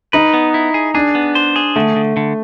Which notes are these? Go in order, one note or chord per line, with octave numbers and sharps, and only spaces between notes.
D#4 B4
B3
E4
G#4
D4 G#4
B3
C5
G#4
D3 A3
D3
D3